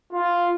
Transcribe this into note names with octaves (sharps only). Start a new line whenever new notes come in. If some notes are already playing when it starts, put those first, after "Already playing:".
F4